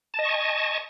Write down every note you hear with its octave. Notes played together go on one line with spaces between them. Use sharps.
D#5 G#5 A5 C#6